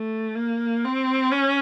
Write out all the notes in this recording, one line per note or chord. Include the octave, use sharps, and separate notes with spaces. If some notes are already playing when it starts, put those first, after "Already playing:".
Already playing: A3
A#3
C4
C#4